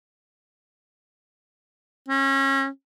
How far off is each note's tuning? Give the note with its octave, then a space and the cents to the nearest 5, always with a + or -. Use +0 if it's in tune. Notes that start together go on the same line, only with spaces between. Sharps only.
C#4 -30